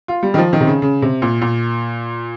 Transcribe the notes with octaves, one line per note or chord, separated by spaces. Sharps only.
F4
G3
D#3
F3
D#3
C3
C#3
C#3
C3
A#2
A#2